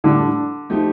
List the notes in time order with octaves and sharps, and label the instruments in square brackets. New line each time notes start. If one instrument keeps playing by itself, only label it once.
[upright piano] A2 G3 D4 [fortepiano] D3
[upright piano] F3 A3 D#4 G4